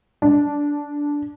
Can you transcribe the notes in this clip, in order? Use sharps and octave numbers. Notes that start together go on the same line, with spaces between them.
D4